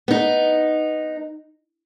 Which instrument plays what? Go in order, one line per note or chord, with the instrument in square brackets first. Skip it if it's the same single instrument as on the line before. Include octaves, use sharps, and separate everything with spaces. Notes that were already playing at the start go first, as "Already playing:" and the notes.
[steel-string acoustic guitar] B3 D#4